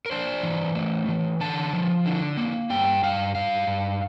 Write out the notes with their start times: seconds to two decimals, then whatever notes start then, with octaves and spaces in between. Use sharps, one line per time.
0.06 A#4
0.11 D4 C5
0.43 E3
0.75 A3
1.09 E3
1.40 D3 A5
1.73 F3
2.06 D3
2.37 A#3
2.70 G2 G5
3.03 G2 F5
3.35 G2 F5
3.67 G2